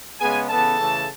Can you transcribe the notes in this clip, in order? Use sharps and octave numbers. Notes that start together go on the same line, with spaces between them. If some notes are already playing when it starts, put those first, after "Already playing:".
C#3 G#3 B3 G#4 G#5
C#3 E3 B3 A4 A5
C#3 E3 A3